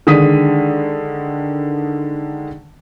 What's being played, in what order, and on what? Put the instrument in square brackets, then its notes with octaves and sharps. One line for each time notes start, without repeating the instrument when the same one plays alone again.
[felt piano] D3 D#3 G#3 D#6 B6 D#7